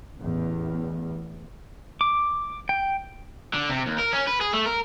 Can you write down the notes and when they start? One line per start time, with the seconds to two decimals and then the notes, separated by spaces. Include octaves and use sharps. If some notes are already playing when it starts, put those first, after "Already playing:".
0.18 A1 E2
2.01 D6
2.69 G5
3.54 D3
3.70 C3
3.86 D#2
3.99 A#4
4.13 C#4
4.28 B4
4.41 G#4
4.53 A3
4.66 A#4